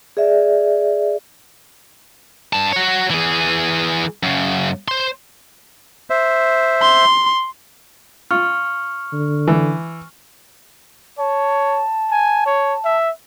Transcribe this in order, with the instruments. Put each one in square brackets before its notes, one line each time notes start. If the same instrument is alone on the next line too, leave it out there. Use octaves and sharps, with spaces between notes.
[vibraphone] G#4 D5 E5
[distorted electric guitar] G2 A5
F#4 C#5
E3 G#4
F#2 C#3
C5 C6
[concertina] C5 E5
[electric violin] C6
[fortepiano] F4 [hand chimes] C#6 F6
[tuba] D3
[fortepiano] E3
[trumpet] C#5 [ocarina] A5
[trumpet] G#5
C#5
E5